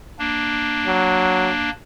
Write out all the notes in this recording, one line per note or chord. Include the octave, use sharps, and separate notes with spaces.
A#3 D4
F#3